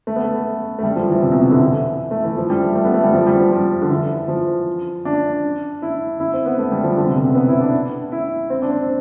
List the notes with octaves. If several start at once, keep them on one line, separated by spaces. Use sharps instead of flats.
A3
B3
A3
A3
G3
F3
E3
C3
B2
C3
D3
E3
A3
E3
F3
G3
A3
A3
B3
A3
G3
F3
G3
F3
F3
D3
E3
F3
D4
E4
E4
C4
B3
A3
G3
F3
D3
C3
B2
C3
B3
E4
D4
E4
C4
D4
C4